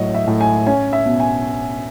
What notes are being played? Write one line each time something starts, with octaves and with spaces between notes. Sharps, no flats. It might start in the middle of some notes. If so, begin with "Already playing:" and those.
Already playing: A2 F#3 D#5
E5
A2
G#5
C#4 G#5
E5
B2
G#5